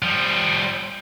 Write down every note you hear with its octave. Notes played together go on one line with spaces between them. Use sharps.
F3 G3